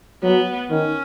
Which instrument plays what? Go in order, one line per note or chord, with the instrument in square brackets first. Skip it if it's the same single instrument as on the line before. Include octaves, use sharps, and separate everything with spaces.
[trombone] F#3 [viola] B3
[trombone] D#3 [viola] C#4